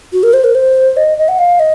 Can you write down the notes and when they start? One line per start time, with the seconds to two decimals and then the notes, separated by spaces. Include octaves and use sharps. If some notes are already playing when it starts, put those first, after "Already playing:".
0.13 F#4
0.23 A#4
0.34 C5
0.44 A#4
0.55 C5
0.97 D#5
1.18 D#5
1.28 F#5
1.39 F5
1.60 D#5